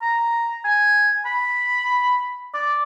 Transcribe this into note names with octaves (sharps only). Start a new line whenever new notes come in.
A#5
G#5
B5
D5